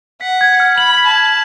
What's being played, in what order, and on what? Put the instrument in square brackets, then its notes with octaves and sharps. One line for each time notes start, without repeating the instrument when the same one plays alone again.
[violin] F#5 [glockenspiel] B6
[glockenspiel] G#6
F6
[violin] B5 [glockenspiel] F#7
[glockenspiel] B6
[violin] A5
[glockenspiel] G#6